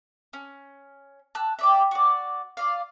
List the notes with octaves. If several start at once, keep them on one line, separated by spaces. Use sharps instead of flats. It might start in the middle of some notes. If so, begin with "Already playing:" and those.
C#4
A5 E6 F#6
G4 D5 E5
F#4 D5
F4 D5 F5